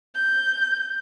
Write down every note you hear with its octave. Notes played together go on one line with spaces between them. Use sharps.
G6